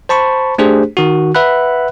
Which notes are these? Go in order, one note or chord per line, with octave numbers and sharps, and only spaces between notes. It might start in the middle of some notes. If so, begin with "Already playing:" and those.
C5 A5 B5 C#6
A3 D4 G4 G#4 C5
D#3 F#4
B4 E5 F#5 B5 F#6